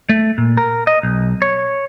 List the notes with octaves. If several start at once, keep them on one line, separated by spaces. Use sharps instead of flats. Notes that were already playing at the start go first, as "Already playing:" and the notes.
A3
A#2
A#4
D#5
B1
C#5